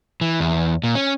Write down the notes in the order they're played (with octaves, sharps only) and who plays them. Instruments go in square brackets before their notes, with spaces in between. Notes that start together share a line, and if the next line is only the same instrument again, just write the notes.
[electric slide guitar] E3
E2
A#2
C#4